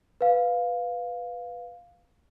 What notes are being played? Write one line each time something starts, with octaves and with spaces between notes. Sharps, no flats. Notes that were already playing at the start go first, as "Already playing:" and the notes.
B4 F5